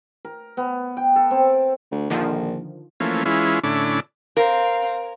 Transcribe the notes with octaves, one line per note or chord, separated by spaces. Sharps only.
A#4
B3
G5
A4
C4
D2
A#1 D3 D#3 F3
E3 F3 A3 A#3 C#4
E3 G#3 C#4 E4 F4
A2 D3 C#4 D4 E4 D6
C4 A#4 F5